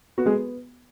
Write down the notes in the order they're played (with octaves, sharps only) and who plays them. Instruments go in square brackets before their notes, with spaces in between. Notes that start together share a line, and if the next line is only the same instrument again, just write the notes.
[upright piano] B3 F#4
G#3 G#4